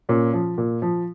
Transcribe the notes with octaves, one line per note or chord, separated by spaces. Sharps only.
A#2 C#4
F3
A#2
F3